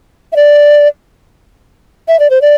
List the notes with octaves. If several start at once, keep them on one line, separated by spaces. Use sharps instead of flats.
E5
D5
E5
D5
C5
D5